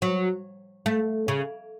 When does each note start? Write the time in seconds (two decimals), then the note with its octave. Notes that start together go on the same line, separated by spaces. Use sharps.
0.02 F#3
0.86 A3
1.28 C#3